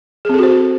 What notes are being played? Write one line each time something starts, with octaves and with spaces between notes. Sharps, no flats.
C4 F#4 G#4 A4 C5